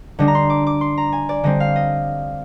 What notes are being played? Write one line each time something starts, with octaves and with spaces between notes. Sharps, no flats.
D3 G3 D4 D#5
A#5
C6
D6
D6
C6
A#5
G#5
D5
D3 G3 C4 D#5
F5
D#5